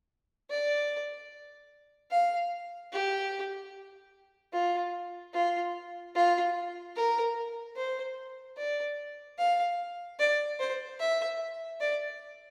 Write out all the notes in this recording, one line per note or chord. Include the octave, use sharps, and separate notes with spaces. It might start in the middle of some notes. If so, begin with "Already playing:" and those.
D5
F5
G4
F4
F4
F4
A#4
C5
D5
F5
D5
C5
E5
D5